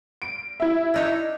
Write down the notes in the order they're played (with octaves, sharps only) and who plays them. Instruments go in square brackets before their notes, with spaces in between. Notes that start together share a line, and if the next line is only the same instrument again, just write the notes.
[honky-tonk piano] D7
E4 E5
[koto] D4 D#4 C#5